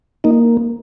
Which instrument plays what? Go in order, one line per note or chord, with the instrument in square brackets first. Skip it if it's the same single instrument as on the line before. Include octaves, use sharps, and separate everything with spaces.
[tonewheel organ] A#3 D#4